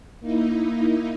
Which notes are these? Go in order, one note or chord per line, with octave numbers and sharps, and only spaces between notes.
A#3 D#4 E4